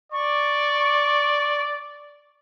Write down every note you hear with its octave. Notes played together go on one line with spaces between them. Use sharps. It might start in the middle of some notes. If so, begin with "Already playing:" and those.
D5 C#6